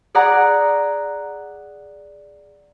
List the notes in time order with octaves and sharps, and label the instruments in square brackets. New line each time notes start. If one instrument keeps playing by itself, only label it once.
[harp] G#4 D5 F#5 A#5